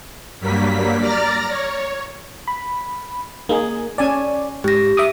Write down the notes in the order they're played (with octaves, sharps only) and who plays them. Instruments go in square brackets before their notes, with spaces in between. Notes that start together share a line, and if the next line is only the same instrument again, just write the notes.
[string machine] G2 F#3 G3 A#3 B6
D5 A#5 F6 A6 A#6
C#5
[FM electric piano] B5
[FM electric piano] A#3 [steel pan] D#4 G#4
[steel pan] C#4 G#5 A5 [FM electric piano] D5
[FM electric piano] G#2 [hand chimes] G4 A#6
[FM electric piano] E5 D6 D#6